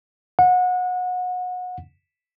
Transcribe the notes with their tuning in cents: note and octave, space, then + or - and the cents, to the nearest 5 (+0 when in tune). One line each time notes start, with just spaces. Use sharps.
F#5 -25